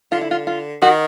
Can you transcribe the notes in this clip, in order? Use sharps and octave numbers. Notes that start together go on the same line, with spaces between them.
D3 F4
E4
F4
F4
D#3 F#4